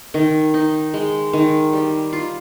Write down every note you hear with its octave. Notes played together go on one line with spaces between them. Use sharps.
D#3
D#4
G#3
D#3
G3
F4